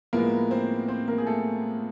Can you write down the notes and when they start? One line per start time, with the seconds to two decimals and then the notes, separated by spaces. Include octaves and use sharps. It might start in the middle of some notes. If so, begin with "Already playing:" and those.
0.13 A2 F3 G#3 A#3 B3 A#4
0.51 C4 C5
0.88 C4 C5
1.08 A#3 A#4
1.18 G#4
1.26 A3 A4